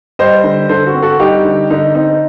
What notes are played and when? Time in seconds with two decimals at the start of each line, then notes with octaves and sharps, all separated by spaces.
0.19 G3 C5 D#5
0.44 D3
0.69 D3 A4 C5
0.86 F#4
0.94 C4
1.02 F#4 A4
1.19 G3 D#4 G4
1.44 D3
1.70 D3 D#4
1.95 C4 D#4